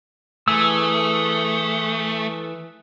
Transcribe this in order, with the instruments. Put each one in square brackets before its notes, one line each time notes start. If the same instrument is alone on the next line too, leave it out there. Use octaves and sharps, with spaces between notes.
[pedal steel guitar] E3 G#4 E6 [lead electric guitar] A3